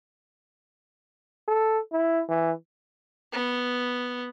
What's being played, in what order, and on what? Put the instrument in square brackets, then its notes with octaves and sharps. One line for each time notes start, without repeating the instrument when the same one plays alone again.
[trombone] A4
E4
E3
[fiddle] B3